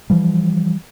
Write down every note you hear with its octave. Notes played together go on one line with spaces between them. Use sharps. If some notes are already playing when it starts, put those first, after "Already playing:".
E3 F3 G3